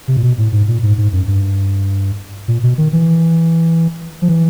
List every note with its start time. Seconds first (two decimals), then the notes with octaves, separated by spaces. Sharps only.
0.08 C3
0.17 A#2
0.23 B2
0.38 A2
0.52 G#2
0.68 A#2
0.83 G#2
0.98 G#2
1.13 F#2
1.28 G2
2.48 A#2
2.63 B2
2.78 D#3
2.93 E3
4.22 F3
4.28 E3